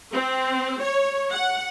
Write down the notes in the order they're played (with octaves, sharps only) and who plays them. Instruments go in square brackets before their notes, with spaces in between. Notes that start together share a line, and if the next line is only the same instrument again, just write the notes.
[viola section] C4
C#5
F#5